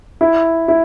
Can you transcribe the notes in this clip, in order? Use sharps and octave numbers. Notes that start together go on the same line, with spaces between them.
E4
E4